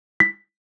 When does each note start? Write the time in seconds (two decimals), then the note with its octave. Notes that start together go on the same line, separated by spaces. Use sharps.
0.20 B6